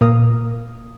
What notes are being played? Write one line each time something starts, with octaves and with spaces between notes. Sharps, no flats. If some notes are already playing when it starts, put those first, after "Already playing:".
A#2 A#3 A#4 F5 D#6